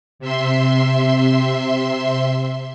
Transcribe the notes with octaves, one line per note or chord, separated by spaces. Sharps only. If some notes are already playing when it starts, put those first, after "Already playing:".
C3 E5 C6